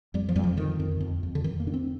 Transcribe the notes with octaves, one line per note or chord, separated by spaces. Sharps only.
F2 G3
F3
F2 G3
F3
D3 D#3
F2
F2
F2
D3
F2 D#3
A#3
D3 D4
C4